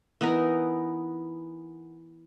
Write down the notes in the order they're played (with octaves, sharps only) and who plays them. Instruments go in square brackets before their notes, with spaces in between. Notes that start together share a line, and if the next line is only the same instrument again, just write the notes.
[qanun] E3 B3 D#4 A#4